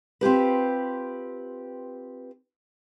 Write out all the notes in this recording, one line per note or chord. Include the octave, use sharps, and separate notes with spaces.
C4 F4 G4 B4